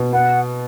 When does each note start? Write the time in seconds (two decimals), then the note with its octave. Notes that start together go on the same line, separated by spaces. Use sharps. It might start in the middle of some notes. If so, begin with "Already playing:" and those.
Already playing: B2
0.13 B3 F#5